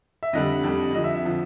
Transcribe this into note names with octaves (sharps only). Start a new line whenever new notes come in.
E5
F2 D3 G3 D#5
F2 D3 G3
F2 D3 F3 D#5
E5
E5
D3 F3